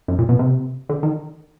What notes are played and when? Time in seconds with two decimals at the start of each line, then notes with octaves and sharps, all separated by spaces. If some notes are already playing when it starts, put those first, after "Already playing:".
0.08 F#2
0.19 A#2
0.29 B2
0.39 C3
0.89 D3
1.03 D#3